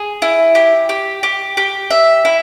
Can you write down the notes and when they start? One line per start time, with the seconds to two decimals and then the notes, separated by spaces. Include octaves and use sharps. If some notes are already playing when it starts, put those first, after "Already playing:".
Already playing: G#4
0.22 E4
0.55 G4
0.89 G4
1.23 G4
1.57 G4
1.91 E5
2.25 E4